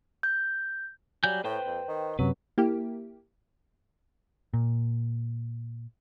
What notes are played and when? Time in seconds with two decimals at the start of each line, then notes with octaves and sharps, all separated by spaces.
0.23 G6
1.24 F#3 G3 G#5 G6
1.44 A2 B4 C5 G5
1.66 F2
1.88 D#3
2.19 F#2 C3 F#3 B4
2.58 A#3 E4 G4
4.53 A#2